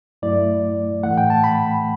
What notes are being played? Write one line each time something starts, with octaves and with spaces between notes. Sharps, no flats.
G2 F#3 A3 E4 D5
A2 E3 A3 F#5
G5
A5
B5